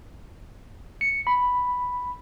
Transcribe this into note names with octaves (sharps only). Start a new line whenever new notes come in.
C#7
B5